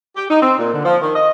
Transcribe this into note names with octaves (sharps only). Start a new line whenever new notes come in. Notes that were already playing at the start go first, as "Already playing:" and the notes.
G4
D#4
C4
A#2
D3
F3
D#3
D#5